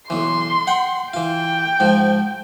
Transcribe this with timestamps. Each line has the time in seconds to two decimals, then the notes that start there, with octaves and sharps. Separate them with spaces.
0.10 B1 E3 C6
0.67 F#5 G5
1.14 E3 F4 G5
1.80 G#2 F3